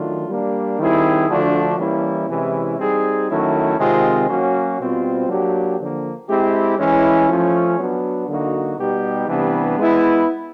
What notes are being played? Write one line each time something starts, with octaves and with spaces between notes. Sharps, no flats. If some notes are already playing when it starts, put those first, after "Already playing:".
Already playing: D#3 F#3 A3 D4 F4
G3 A#3 D4
D#3 G3 C4 E4 G#4
D3 F3 A3 D4 F#4
E3 G3 A#3 C#4 E4
C3 E3 G#3 C#4 E4
G3 C4 D#4 G#4
D#3 F#3 A3 C#4 E4
C3 D#3 G#3 C4 F4
F#3 A#3 C#4 F#4
B2 G3 C4 F4
F#3 A#3 D4 G4
D3 F3 A#3
G#3 C4 E4 G4
E3 G#3 C#4 E4
F3 A3 C#4
F#3 B3 D4
D3 F#3 A#3 D#4 F#4
B2 G3 B3 D#4 G4
C3 E3 G3 B3 D4
G#3 B3 E4